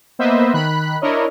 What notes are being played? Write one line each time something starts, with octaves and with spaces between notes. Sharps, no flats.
A#3 B3 B4 C5 D#5 E5
D#3 B5 F#6
D4 E4 A#4 C#5 D#5